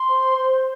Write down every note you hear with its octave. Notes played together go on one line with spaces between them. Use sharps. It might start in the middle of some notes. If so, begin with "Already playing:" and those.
Already playing: C6
C5
C5